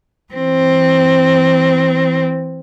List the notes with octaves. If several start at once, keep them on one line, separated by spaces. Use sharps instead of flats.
E3 C4